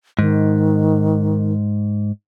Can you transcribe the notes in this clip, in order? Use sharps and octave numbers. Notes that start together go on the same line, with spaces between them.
G#2 D#3